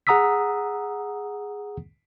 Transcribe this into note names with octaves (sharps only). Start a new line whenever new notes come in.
G#4 F#5 A#5 D#6 E6 B6